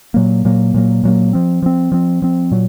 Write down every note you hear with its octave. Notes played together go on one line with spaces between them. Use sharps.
A#2 F#3 A#3
A#2 F#3 A#3
A#2 F#3 A#3
A#2 F#3 A#3
F3 C4
F3 C4
F3 C4
F3 C4
A#2 F#3